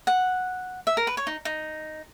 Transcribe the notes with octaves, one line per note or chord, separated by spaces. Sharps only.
F#5
E5
A#4
B4
C#5
D#4
D#4